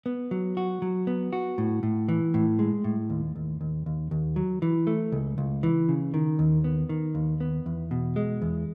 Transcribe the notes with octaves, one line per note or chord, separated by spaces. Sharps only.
B3
F#3
F#4
F#3
B3
F#4
A2
A2
E3
A2
G#3
A2
D#2
D#2
D#2
D#2
D#2
F#3
E3
A3
C#2
C#2
E3
C#3
D#3
D#2
B3
D#3
D#2
B3
E2
B2
G#3
E2